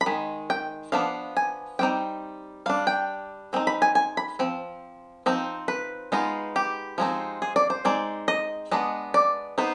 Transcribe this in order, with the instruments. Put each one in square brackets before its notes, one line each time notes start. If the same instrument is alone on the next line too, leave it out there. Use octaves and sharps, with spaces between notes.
[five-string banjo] B5
D#3 G#3
G5
F3 B3 D4 F5
G#5
G3 C4 D#4 G5
G3 D4 F5
G5
G#3 C4 D#4
B5
G#5
G#5
B5
F3 C4
F3 C4 D#4
B4
G#3 B3 D#4 F4
G4
F3 G#3 C4 D#4
G#4
D5
C5
G#3 C4 D#4 D5
D#5
G#3 B3 D4 D#5
D5
B3 D#4 C5